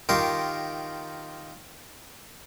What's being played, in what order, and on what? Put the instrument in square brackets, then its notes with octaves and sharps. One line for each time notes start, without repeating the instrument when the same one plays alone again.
[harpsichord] D#3 F4 G4 A#4 C6 C#6